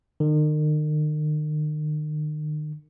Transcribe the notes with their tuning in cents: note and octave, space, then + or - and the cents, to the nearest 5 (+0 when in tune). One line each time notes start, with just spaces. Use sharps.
D#3 -40